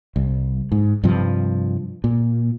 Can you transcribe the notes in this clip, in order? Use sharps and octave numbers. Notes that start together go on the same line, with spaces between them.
C2
G#2
G2 C3 F3
A#2